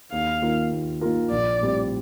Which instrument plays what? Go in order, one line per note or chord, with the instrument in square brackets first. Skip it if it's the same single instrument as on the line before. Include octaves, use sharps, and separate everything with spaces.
[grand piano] D#2 [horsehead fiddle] F5
[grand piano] D#3 A#3 F4 A#4
D#2
D#3 A#3 F4 A#4
[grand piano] A#1 [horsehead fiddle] D5
[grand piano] A2 G3 C4